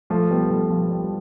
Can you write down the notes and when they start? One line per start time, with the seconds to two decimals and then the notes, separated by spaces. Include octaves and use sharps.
0.10 F3 A3
0.31 G3 B3
0.50 F3 A3
0.70 F3
0.90 G3
1.04 G3